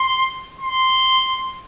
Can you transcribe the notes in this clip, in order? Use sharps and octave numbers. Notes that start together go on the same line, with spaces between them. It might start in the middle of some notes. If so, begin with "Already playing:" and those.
Already playing: C6
C6